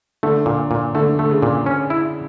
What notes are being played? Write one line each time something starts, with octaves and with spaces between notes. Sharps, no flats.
D3 A3
A#2
A#2
D3 A3
A3
C#3
A#2
C#4
E4